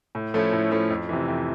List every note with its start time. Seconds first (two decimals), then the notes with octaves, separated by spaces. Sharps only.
0.15 A2
0.34 F3 A3 C#4 E4
0.53 A2
0.71 F3 A3 C#4 E4
0.90 F2
1.09 C3 E3
1.28 F2